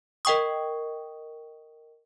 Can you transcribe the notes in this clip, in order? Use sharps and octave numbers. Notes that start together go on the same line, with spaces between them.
A#4 D#5 G5 C#6 D#6